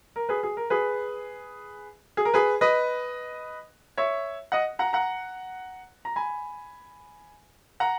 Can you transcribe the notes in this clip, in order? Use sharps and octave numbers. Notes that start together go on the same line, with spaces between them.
A#4
G#4 B4
G#4
A#4
G#4 B4
G#4
A#4
G#4 B4
B4 D#5
C#5 E5
D#5 F#5
F#5 A#5
F#5 A#5
A#5
G#5 B5
F#5 A#5